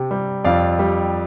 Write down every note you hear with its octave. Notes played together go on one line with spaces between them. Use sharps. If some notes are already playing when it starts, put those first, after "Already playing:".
Already playing: C3 C4
G3
F2 D5 F5
G3